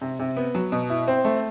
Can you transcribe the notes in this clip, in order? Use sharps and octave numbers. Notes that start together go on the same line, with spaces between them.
C3
C3
B3
F#3
B2
E4
C4
A3